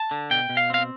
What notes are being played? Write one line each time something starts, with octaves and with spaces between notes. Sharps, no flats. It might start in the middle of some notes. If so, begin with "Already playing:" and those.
Already playing: A5
D3
B2 G5
B2
F5
C4 F5